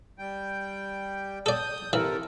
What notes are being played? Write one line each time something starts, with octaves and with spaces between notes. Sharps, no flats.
G3 G5
A4 D5 D#6 G6
C3 E3 A4 A#4